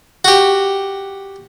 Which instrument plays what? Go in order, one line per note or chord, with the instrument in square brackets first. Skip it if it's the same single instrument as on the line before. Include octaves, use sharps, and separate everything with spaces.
[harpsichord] F#4 G4